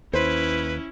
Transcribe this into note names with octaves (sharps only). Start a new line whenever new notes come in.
D#2 C#4 E4 B4 C5